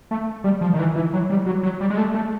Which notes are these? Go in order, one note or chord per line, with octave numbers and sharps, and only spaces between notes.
A3
G3
F3
D#3
E3
E3
F#3
G3
F#3
F#3
G3
G#3
A3
A3